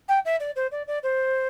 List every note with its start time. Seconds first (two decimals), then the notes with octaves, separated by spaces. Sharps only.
0.08 G5
0.25 E5
0.40 D5
0.56 C5
0.71 D5
0.87 D5
1.03 C5